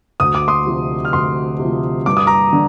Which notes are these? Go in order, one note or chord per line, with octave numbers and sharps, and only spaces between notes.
D2 D#6
D6
C6 D#6
C3 F3
F6
D2 C6 D#6
C3 F3
G2 D6
D#6
A#5 D6
D3